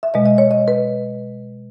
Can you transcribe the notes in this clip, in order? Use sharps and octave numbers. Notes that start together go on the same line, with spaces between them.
E5
B2 G#3 D#5
D#5
C#5
D#5
B4